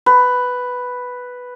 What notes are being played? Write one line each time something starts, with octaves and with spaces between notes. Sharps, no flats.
B4